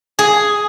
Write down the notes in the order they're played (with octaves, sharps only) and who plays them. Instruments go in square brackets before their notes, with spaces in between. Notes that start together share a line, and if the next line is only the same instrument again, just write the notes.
[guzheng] G#4